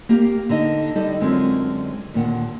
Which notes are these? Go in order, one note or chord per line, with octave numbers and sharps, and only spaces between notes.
A#3 G4 F5
D3 D#4 D#5
G3 D#4 A4 D#5
F#2 D3 G#3 C4 C#4 F4
D#2 A#2 D3 F#5